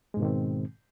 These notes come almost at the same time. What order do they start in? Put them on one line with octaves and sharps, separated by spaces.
G#3 G#2 B2 D#3 C4